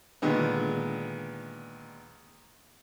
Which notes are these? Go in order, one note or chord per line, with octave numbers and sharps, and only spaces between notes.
A#2 D3 D#3 G#3 B3